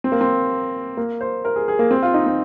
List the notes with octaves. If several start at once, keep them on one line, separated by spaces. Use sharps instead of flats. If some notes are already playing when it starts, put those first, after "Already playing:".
C4
A#3
C4
A#3
C5
A#4
G#4
G#4
A#3
C4
F4
D#4
C4